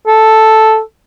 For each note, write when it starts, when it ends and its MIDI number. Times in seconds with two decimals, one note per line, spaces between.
0.07 0.80 69